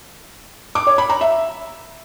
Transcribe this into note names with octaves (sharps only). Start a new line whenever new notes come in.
D6
C#5
B5
A#5
E5